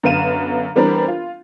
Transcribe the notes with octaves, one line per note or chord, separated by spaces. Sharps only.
F#2 D3 B3 F5 D#7 E7
E3 G3 B3 C4 D4 A#4
F4